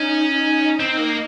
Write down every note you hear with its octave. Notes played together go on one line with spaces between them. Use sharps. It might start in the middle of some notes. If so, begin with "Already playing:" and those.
Already playing: C#4 D#4
C4
A#3